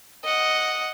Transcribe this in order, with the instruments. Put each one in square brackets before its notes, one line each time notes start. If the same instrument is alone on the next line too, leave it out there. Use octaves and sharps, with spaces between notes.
[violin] D#5 F#5